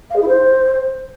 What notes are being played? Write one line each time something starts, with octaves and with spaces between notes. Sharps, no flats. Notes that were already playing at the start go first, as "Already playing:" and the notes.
F5
G#4
E4
C5